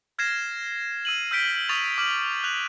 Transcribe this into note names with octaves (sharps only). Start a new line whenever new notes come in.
F6 G#6 A#6 C7 E7
E6 D#7 F#7
E6 F6 G6 B6 D7 G7
C#6 D#6 A6 D#7 F7
D6 F6 F#7
F#6 F7 F#7